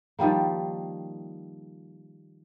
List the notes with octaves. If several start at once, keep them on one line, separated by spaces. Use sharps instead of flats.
D#3 F3 G3 A#3